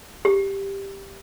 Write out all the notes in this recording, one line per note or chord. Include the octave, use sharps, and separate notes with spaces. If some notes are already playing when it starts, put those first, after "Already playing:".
G4